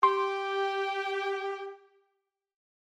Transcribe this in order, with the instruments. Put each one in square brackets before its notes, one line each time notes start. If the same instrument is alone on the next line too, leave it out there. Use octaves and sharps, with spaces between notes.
[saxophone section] G4 [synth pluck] C6